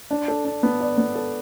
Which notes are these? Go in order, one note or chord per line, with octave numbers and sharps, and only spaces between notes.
D4
A4
D4
B3
D5
B3
A4